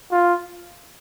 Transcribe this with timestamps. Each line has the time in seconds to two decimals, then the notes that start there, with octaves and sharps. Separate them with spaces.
0.12 F4